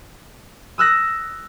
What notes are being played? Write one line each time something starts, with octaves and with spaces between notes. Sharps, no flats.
D#6 E6 F#6 A#6